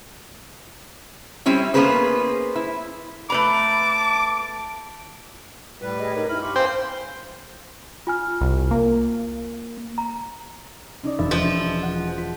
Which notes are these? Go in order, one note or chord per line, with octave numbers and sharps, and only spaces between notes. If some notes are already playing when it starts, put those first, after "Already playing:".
G3 C4 C#4 E4
A#3 B3 C#4 G#4 B4 C5
E4
A3 B4 A5 A#5 D6
A2 G3 B4
G#4 D#5
D#4 A#4 C#5
G2 E4 B5 E6 F6
G4 C6 C#6
C5 F5 G5 G#5
F4 G#5 F6
C2
A#3
A#5
C#4 D#4 D5
E1 E5 A6
F3
F#5
B6